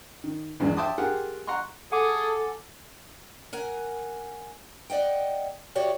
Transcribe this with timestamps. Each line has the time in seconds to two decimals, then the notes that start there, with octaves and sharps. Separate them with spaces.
0.24 D#3
0.60 A#1 E2 G2 G#3
0.77 E5 G5 A5 C6 D6 D#6
0.98 F4 G4 G#4 A#4 F#5
1.47 F#5 A#5 C6 C#6
1.92 G#4 A4 F#5 G#5 D6
3.53 A#4 F#5 G#5
4.90 D5 D#5 F#5 G5
5.75 F#4 G4 C#5 D5 E5